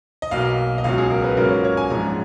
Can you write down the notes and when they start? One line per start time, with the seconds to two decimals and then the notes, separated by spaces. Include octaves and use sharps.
0.22 D#5
0.31 B1 B2 A#3 F5
0.78 D#5
0.84 C#2 B2 F#3 F5
0.98 G#4
1.10 A#4
1.24 B4
1.37 G#2 F#3 A#3 C#4 F4 A#4
1.50 C#5
1.64 C#5
1.77 G#5
1.90 A#1 G#2 F3 G#3 C#4 A#5